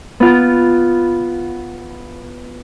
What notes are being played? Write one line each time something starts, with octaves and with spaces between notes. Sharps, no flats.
B3 F4